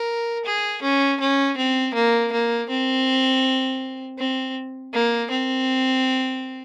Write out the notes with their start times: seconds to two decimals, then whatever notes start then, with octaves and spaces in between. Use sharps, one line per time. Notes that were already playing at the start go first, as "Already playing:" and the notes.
Already playing: A#4
0.45 G#4
0.82 C#4
1.20 C#4
1.57 C4
1.94 A#3
2.32 A#3
2.69 C4
4.19 C4
4.94 A#3
5.31 C4